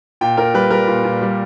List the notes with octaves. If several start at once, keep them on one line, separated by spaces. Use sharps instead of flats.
A#2 G5
A#2 A#4
G3 B4
G3 A#4
A#2
A#2
G3